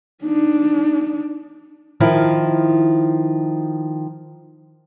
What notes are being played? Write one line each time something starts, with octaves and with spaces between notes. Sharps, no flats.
D4 D#4
D#3 F3 E4